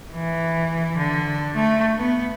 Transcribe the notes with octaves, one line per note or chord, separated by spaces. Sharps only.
E3
D3
A3
B3